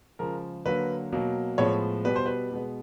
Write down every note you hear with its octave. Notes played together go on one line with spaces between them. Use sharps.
C#3 F3 G#3 A#4
D3 F#3 A#3 B4
B2 F#3 A#3
A2 F3 G#3 B3 C#5
B2 G3 B3 B4
C5
B4
B2 G#3 B3